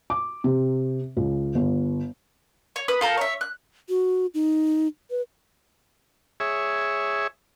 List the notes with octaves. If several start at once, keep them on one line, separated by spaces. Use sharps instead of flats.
D6
C3
C#2
G1
C#5
B4 D#6
F4 A4 A#4 G5
C#5 E5
F#6
F#4
D#4
B4
G#4 C#5 E5